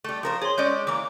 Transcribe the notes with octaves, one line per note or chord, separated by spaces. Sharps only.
G3 A3
F3 A#4 C5
G#4 C#5 C6
G#3 C#4 D5 G6
E3 A#3 D6